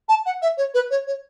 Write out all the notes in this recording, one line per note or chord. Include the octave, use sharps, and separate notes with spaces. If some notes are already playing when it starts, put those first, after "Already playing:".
A5
F#5
E5
C#5
B4
C#5
C#5